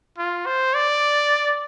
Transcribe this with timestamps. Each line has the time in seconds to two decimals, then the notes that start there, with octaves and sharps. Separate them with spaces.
0.18 F4
0.46 C5
0.74 D5